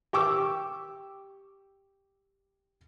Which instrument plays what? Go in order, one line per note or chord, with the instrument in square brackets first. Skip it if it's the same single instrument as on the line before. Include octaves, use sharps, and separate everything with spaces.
[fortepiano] G4 C#6 D6 E6